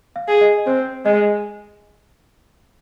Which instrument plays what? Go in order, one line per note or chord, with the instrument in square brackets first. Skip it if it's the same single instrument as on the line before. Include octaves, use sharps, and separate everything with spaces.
[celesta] F5
[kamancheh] G#4
[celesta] D#5
[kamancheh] C4 [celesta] C5
[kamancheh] G#3 [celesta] D#5